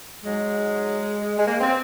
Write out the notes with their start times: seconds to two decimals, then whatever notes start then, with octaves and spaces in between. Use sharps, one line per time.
0.23 G#2 F#3 G#3
1.38 G#3
1.46 A#3
1.61 C4